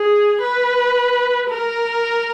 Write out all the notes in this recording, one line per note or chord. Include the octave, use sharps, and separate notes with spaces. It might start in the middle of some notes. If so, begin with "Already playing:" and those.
Already playing: G#4
B4
A#4